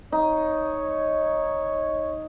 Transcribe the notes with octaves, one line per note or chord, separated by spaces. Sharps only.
D#4 C#5